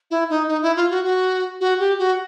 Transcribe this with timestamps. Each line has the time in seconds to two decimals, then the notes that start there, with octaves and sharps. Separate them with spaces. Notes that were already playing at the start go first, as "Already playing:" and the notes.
0.11 E4
0.30 D#4
0.48 D#4
0.62 E4
0.76 F4
0.90 F#4
1.04 F#4
1.61 F#4
1.80 G4
1.99 F#4